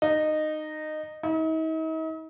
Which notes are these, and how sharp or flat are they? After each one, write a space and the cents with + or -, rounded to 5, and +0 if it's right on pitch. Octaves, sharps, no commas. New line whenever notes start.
D#4 -15
D#4 +45